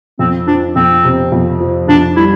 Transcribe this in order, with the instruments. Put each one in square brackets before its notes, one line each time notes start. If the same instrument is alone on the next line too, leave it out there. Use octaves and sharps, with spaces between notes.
[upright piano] F2 [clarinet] C4
[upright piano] F3 [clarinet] D4
[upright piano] F2 [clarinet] C4
[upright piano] C3
F2
F3
[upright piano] F2 [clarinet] D4
[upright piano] G3 [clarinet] E4